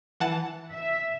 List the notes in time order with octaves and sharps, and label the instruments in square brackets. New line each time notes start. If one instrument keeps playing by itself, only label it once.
[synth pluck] E3 F#5 A5
[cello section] E5